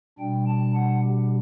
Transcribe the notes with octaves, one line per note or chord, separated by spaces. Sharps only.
B2 G3 D4 G5
A5
F#5
G4